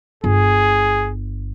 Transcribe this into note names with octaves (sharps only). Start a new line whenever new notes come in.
G1 G#4